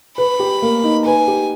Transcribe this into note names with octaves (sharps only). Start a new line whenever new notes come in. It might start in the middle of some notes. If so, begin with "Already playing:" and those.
B4 B5
G4
A#3
D#4
B4 G#5
G4